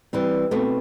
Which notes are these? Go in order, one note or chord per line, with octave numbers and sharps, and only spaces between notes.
E3 G3 C4
B2 A3 C4